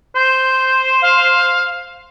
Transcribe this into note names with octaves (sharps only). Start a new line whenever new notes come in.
C5 G6
F5